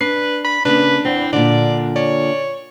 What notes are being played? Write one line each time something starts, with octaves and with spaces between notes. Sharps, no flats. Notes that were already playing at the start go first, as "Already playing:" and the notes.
D4 B4 C7
B5
C#3 A#3 D4 B4
E2 C4
A#2 D3 D4 D5
C#5 D5